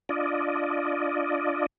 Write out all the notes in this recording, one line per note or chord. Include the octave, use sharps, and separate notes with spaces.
D4 F4 D5 D#5